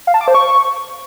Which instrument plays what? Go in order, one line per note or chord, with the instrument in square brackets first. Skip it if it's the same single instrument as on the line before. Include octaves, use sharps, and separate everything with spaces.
[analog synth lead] F5
A5
D6
C5
C#6